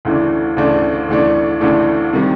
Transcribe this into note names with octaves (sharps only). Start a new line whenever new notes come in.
D2 C#3 E3 A3 D4
D2 C#3 E3 A3 D4
D2 C#3 E3 A3 D4
D2 C#3 E3 A3 D4
C3 D#3 G3